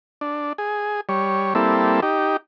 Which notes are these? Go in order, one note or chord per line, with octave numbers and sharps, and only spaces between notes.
D4
G#4
G3 C#5
G3 A#3 C4 E4 A4
D#4 G4